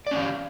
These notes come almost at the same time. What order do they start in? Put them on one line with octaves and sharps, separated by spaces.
D5 C#4 F5